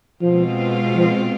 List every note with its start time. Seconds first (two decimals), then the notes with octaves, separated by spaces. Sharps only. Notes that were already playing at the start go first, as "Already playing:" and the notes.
0.21 B2 F3 G#3 C4 F4
0.95 F3